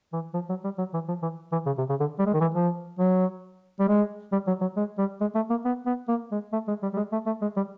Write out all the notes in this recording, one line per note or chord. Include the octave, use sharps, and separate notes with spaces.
E3
F3
F#3
G3
F#3
E3
F3
E3
E3
C#3
C3
C#3
D3
G3
G#3
D#3
E3
F3
F#3
G3
G#3
G3
F#3
F#3
G#3
G3
G#3
A3
A#3
B3
B3
A#3
G#3
A3
G#3
G3
G3
G#3
A3
A3
G#3
G3